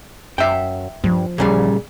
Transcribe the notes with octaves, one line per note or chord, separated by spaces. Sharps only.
F#2 E5 G5
G2 F3
A1 A#2 C#3 G3